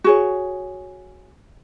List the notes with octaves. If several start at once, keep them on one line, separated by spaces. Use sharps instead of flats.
F#4 G#4 C#5